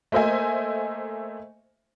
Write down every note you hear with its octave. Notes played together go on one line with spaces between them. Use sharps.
A3 A#3 C5 D#5 E5 G#5